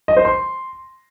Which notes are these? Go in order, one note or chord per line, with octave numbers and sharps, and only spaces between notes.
D#5
C5
C6